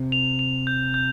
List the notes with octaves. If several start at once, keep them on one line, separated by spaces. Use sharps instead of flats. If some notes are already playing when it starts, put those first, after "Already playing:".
Already playing: C3
F7
F7
G6
G6